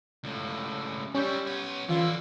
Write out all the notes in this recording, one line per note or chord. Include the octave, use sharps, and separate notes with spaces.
C#2 A2
G3 C#4 E4 G4 C#6 G6
B3 C#5
D3 E3 E4 F4